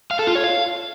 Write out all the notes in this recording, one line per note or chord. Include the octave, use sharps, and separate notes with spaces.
F5
A4
F4
C#5
F5